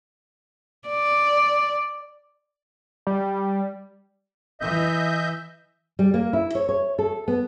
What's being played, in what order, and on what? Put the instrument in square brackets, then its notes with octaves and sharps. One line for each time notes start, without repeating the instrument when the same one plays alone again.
[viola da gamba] D5
[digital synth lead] G3
[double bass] E3 [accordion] D#5 E5 G6
[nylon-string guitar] G3
A#3
E4
C#5
C#5
A4
B3